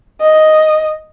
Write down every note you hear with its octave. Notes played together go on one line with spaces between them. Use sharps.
D#5